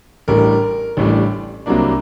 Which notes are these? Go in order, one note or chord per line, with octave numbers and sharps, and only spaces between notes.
A1 A2 G3 D4 A#4
A1 A2 G3 D4
C2 C3 F#3 A#3 D4